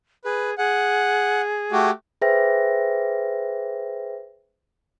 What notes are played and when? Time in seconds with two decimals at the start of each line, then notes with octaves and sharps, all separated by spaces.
0.25 G#4 B4
0.58 G#4 F#5
1.72 A3 F#4 G4
2.22 G#4 B4 C5 E5 G5 A#6